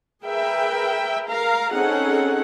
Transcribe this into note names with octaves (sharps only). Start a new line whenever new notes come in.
G#4 A#4 B4 E5 G5
A#4 F5 A#5
C4 C#4 D#4 G#4 A4 F#5